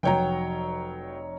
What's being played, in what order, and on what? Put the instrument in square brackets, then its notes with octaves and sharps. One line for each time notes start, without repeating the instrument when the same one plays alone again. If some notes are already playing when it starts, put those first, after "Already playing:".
[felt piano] F1 C#5 A#5 [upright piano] F#3 G5